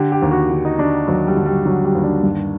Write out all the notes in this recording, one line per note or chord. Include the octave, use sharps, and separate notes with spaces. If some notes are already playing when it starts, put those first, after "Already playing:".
Already playing: D3 G4
G4
D#2
F#4
D3
D#4
D3 D4
D#2 F#3
G3
D3
G3
D3 F#3
G3
D#2
D4
G2